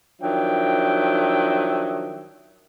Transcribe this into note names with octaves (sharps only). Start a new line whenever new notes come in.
D#3 F3 F#3 D4 E5 G5